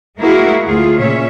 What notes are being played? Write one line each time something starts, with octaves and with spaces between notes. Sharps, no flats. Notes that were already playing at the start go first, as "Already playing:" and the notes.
G#3 A#3 E4 F#4 G#4 A#4
D2 F4 G#4
A#2 C#3 C#4 C#5 E5